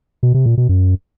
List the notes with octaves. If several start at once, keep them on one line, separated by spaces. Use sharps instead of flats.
B2
C3
A#2
B2
F#2